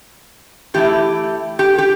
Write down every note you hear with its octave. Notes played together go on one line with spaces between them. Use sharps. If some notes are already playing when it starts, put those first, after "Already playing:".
E3 A3 E4 G4
G4
G4